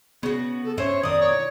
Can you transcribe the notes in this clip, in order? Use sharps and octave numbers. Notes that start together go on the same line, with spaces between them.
C#3 B3 F#4
A4
G2 C#4 C5 C#5 E5
F2 B2 D#3 A#4 D5 D#6
C#5